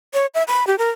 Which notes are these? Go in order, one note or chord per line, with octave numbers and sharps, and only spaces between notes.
C#5
E5
B5
G4
A#4